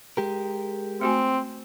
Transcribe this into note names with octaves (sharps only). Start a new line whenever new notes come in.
G#3 G4 A#4
A3 C4 F#4 G#5